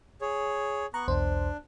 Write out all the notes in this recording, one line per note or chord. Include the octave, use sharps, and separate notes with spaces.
G#4 C#5
B3 A#5 C#6 F#6
B1 E2 D4 C5